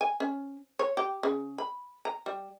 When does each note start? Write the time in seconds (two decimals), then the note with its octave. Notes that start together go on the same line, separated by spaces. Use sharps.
0.01 G#5
0.20 C#4
0.79 C#5
0.97 G4
1.23 C#3
1.58 B5
2.05 A#5
2.26 G3